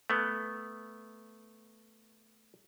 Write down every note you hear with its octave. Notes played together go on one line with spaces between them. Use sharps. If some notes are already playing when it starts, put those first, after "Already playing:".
A3 B3